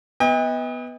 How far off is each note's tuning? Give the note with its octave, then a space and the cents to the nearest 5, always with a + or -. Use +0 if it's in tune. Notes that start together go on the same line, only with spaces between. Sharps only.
B3 +0 D#5 +40 G5 +45